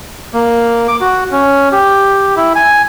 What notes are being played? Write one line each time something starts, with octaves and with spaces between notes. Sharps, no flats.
A#3
D6
F#4
C#4
G4
E4
G#5